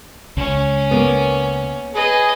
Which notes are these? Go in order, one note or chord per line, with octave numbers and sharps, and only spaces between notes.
C#2 C#4
A#3 B3
G#4 B4 D#5